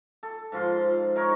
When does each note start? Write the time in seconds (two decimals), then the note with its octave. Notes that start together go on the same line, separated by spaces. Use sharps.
0.23 A4
0.52 G#2 F3 F4 C6
1.16 D#4 A#4 C#5